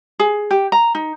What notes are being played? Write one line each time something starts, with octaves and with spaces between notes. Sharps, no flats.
G#4
G4
A#5
D#4